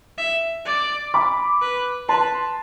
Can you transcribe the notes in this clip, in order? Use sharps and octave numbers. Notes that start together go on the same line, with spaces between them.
E5
D5
B5 D6
B4
B4 A5 C6